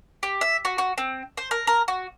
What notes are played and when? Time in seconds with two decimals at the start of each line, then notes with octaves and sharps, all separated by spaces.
0.23 G4
0.41 E5
0.65 F#4
0.78 F#4
0.98 C4
1.37 C5
1.51 A#4
1.67 A#4
1.88 F#4